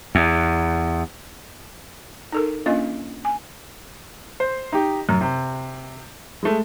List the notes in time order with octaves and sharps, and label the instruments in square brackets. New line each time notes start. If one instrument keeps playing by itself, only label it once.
[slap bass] E2
[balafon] D#4 A4 A#4
A#3 C#4 D4 F4 D#5
G#5
[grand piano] C5
D#4 G4
F#2
C3
G#3 A3